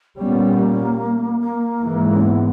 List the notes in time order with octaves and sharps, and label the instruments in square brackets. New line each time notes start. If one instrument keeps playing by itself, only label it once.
[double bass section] A#2 G3 C#4 [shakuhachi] B3
[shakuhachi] A#3
A#3
[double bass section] G#2 E3 G#3
[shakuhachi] C#4
B3